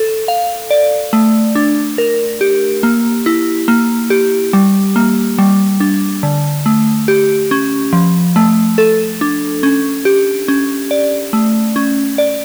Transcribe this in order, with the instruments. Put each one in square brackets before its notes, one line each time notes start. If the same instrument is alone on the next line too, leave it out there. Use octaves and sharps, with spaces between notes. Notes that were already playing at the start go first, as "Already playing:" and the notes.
Already playing: [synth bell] A4
F5
D5
A3
D4
A#4
G4
A#3
E4
A#3
G4
G3
A#3
G3
D4
D3
A3
G4
C#4
F3
A3
A4
D4
C#4
G4
C#4
D5
A3
C#4
D5